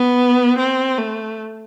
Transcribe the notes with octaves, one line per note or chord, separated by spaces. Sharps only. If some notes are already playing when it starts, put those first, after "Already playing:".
Already playing: B3
C4
A3